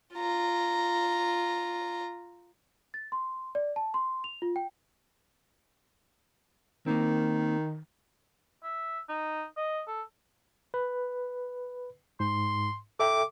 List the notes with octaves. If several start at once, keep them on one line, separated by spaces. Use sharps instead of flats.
F4 A#5
A6
C6
D5
A5
C6
F7
F4
G5
D#3 A#3 C4
E5
D#4
D#5
A4
B4
G#2 C6
A4 E5 G5 D6